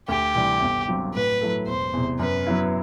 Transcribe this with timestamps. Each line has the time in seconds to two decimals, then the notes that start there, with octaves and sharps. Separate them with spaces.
0.08 D2 G4
0.35 C3 E3 G3
0.62 G1
0.88 G2 F#3 C4 F#4
1.14 A2 B4
1.41 F#3 A3 E4 A4
1.67 E1 C5
1.93 E2 C3
2.19 F#2 B4
2.47 F#3 B3 E4